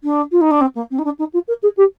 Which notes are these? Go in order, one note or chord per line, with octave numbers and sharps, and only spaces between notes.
D4
F4
D#4
D4
C4
A#3
C4
D#4
D4
D#4
F4
A#4
G#4
G4